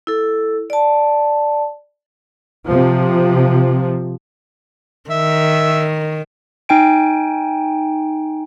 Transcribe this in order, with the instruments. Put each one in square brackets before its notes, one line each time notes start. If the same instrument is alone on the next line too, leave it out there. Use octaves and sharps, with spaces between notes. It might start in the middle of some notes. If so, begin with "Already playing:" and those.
[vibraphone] E4 A4
D5 A5
[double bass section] C3 F3
[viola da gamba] D#3 [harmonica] E5
[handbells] D#4 G5 G#5 D7